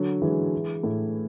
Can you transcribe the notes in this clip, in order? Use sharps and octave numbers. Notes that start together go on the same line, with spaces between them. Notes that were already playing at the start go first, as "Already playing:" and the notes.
Already playing: D3 F#3
E3 G#3
A2